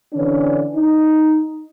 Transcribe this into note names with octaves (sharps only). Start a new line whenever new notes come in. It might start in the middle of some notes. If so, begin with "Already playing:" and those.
D3 E3 C#4 D4 D5
D#4